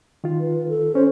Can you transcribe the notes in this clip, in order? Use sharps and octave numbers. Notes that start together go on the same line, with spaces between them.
D#3 F4
B4
A4
C#4 C5